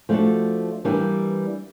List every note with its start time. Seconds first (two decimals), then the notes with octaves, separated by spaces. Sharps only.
0.09 F3 A3 D4 F#4 A4
0.85 E3 G3 A#3 D4